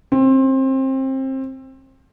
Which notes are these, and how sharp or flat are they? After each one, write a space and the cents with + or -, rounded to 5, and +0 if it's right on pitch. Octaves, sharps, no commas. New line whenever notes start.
C4 +25